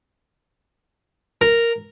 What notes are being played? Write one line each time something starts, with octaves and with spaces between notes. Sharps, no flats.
A#4